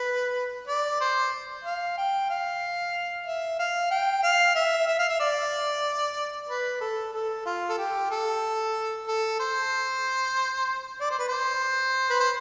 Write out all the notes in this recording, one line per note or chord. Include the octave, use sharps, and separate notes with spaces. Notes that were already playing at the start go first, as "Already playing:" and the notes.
Already playing: B4
D5
C5
F5
G5
F5
E5
F5
G5
F5
E5
E5
F5
E5
D5
B4
A4
A4
F4
A4
G4
A4
A4
C5
D5
C5
B4
C5
B4
C5